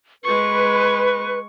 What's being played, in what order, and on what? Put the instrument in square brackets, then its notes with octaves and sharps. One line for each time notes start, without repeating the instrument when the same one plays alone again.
[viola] G#3 C#6 [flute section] B4